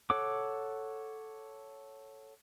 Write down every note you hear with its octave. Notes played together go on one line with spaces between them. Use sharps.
A4 C#5 F#5 D6